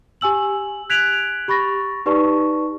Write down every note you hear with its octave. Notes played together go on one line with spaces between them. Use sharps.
G4 G#5 E6 F#7
F#6 G#6 B6 D7 F7 F#7
G4 B5 C#6 A6 A#6
D#4 G4 B4 D5 A5 C#6